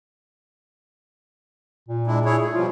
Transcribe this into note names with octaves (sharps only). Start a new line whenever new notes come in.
A#2
G#3 D4 E4
E4 G#4 C#5
A2 A3
B2 F3 G3 F4